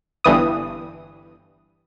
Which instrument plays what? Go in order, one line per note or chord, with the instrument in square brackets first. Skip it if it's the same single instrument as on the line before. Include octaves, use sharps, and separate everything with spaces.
[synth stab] G1 G2 E3 D#6